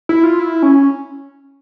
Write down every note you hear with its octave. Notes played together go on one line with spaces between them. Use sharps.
E4
F4
E4
C#4